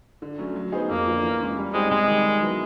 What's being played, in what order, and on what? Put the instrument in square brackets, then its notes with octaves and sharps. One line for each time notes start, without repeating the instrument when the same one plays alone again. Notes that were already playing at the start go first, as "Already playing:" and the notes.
[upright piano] D3
F#3 A3 C#4
F#3
B3 D#4 G#4 C5
[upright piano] F2 [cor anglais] A#3
[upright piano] D3 F3
E3
G#3 C#4
G3
[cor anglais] G#3 [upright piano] C4 D#4 G4 C5
[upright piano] C3 [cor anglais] G#3
[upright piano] D#3 G3
D#3
F#3 B3 E4